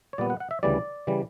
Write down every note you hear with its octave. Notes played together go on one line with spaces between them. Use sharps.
C#5
A#2 G3 B3 D5
F#5
F#5
E5
D2 C#3 E3 G3 D5
C#3 E3 G3